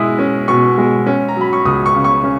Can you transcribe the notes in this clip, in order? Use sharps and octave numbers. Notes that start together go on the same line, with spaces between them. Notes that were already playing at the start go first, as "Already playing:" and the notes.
Already playing: B2 G#3 E4 D#6
C#4
B2 C#6
G#3
C#4
A#5
F#3 B5
C#6
C#2 D#6
C#6
C#3
C#6
C#4